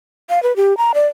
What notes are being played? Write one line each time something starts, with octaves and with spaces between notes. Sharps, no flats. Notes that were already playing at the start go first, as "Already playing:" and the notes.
F5
B4
G4
A#5
D5